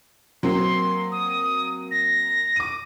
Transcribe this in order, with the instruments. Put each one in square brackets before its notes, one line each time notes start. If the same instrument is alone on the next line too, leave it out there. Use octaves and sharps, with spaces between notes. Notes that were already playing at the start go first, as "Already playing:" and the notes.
[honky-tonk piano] F#3 A#3 C4 [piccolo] C6
[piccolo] D#6
A#6
[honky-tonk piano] D6 D#7